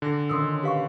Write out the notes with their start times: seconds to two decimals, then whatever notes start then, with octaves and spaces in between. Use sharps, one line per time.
0.02 D3 G#5 D6 A#6
0.29 A#2 D#3 C#4 C6 D#6 E6
0.63 G4 B4 F5 C#6 B6